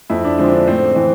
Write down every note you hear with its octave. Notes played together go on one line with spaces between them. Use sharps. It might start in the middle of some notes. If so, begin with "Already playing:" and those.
F2 E4
D4
D3 F3 G#3 C4
D4
A2 C4
E3 C4